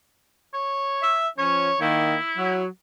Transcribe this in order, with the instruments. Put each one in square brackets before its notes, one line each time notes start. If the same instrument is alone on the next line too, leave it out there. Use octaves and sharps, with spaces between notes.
[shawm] C#5
[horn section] E5
[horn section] F3 C#4 [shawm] C#5
[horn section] D#3 A#3 [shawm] E4
[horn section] F#3